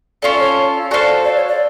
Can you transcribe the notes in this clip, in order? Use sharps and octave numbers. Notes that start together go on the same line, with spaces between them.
C#4 F4 A4 D5
C#5
F#4 A4 C5 D5 F5
D5
C#5
D5